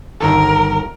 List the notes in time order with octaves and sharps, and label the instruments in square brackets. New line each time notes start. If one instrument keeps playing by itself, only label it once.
[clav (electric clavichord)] G1 D#3 A4 [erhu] A#4